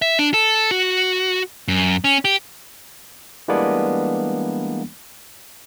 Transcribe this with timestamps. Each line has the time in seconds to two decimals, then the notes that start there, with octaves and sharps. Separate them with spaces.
0.02 E5
0.19 D4
0.34 A4
0.71 F#4
1.68 F#2
2.04 C#4
2.25 G4
3.48 E3 G3 G#3 A#3 B3 D4